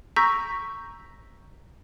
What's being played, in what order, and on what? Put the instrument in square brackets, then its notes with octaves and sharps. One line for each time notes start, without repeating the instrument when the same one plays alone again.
[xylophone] A#5 C#6 E6 G6 A#6 B6